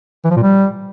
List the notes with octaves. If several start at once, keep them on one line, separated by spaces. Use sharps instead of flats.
E3
F3
A#2
G3